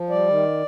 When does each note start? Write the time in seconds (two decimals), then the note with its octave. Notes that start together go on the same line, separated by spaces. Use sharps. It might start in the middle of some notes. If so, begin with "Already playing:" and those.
Already playing: F3
0.10 G3 D5
0.28 D#3